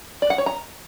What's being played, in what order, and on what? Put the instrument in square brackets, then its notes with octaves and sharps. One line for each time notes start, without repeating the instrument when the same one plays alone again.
[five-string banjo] D5
F#5
C#5
A#5